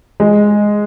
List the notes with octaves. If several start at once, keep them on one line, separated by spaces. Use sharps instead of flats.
G#3